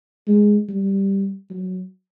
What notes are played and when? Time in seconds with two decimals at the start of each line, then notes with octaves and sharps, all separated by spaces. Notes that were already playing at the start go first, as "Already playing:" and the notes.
0.28 G#3
0.69 G3
1.50 F#3